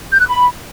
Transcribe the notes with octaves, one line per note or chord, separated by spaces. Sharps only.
G6
F#6
B5